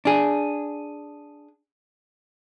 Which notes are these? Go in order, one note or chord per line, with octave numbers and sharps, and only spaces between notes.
D4 G#4